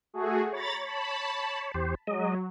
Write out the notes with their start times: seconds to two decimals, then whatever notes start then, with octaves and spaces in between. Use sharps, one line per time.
0.14 A3 F#4 G#4
0.53 C#5 A#5 B5 A6
0.84 A5 B5
1.74 E2 G4 C5
2.07 F#3 G#3 D#5